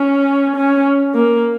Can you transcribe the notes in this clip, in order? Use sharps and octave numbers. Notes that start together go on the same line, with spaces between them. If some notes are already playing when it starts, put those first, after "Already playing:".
Already playing: C#4
C#4
A#3